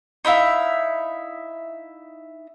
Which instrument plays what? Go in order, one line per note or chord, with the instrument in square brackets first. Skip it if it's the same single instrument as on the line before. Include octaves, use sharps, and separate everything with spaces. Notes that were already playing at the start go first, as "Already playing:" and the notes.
[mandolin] D#4 E4 E5 F5